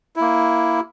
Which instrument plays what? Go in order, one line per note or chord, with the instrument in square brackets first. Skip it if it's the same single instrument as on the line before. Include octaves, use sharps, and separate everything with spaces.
[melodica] A#3 E4